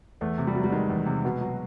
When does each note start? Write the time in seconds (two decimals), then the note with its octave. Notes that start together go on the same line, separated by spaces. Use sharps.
0.21 E2 A3
0.38 C3
0.47 G3
0.55 F#3
0.64 G3
0.72 D#3 G#3
0.90 E2
1.06 C3
1.25 B2
1.41 F#3